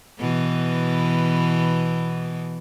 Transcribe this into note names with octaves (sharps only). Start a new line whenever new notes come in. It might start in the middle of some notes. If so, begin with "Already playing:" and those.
B2 E3